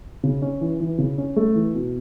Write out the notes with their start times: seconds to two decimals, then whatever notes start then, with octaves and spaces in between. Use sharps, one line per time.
0.23 C#3
0.42 C#4
0.61 E3
0.80 E3
0.98 C#3
1.18 C#4
1.36 A3
1.55 E3
1.74 B2